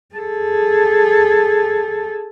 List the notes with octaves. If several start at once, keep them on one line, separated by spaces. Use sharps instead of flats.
G#4 A4